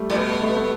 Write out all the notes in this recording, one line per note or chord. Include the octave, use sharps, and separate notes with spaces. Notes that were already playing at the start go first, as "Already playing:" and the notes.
Already playing: G3 A3
A2
B2 B3
A3
B3
A3